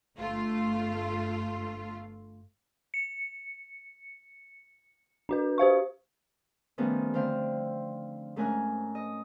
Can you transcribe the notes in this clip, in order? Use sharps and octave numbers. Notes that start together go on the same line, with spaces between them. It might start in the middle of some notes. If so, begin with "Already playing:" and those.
G1 A3 F4
C#7
D4 F#4 B4
G4 C5 F5 C#6
D#3 F3 G3 A3 B3 C#4
D3 A3 C4 C5 F5 G5
G#2 A3 C#4 A#4 G#5 F#6
D#5